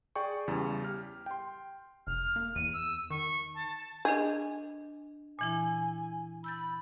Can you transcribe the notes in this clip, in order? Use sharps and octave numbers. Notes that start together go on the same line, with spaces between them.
G#4 D5 G5 C#6
E2 C#3 G3
G4 F6
G5 C6
F1 F6
A#3
E2 D#7
E6
D#3 C#6
A5
D4 G#4 D#5 G6
A#2 E3 E4 G#5
B5 E6 G6 A6